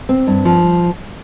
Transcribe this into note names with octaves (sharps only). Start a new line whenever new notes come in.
C4
G2
F3